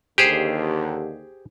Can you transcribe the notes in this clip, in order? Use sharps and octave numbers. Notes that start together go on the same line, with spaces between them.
D#2 D3 G4 G#4 C5